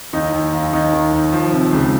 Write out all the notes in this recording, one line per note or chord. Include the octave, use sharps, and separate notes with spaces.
D#2 D#4
D#2
D#2
D#2 D#4
D#3
D#2
F3
C3
C#2